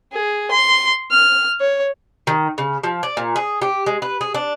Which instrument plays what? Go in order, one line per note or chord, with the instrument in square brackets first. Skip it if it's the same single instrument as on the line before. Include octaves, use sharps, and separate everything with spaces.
[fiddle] G#4
C6
F6
C#5
[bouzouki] D#3
C#3
F3
D5
A#2
G#4
G4
G#3
B4
G#4
D4